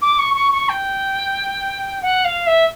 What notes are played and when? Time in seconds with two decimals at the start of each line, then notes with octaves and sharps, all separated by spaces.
0.02 D6
0.19 C#6
0.35 C#6
0.52 C#6
0.69 G5
2.02 F#5
2.25 F5
2.47 E5